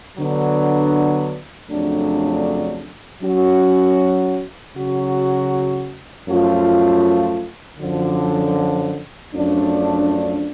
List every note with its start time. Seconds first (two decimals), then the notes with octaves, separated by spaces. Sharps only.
0.16 D3 F#3 B3 D4
1.69 F2 C#3 F#3 A3 D4
3.21 F#3 C#4 F#4
4.74 C#3 F#3 C#4 F#4
6.27 F#2 F3 A3 F4
7.80 F#2 D3 F3
9.33 F#2 F3 A3 D4